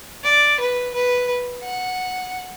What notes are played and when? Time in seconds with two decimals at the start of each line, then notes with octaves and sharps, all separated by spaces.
0.24 D5
0.59 B4
0.94 B4
1.64 F#5